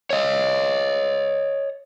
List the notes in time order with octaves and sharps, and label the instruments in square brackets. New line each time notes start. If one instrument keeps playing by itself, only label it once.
[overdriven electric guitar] C#5 D#5